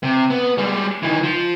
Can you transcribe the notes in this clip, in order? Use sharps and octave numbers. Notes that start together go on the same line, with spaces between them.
C3
B3
G3 G#3
D#3 E3
F3